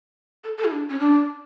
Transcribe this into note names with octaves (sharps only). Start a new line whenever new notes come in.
A4
A4
E4
D4
C#4
D4